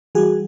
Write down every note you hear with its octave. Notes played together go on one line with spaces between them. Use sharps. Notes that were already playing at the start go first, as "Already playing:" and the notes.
E3 G3 F#4 G#4